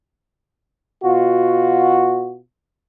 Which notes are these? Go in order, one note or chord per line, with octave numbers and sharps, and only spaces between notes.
B2 F4 F#4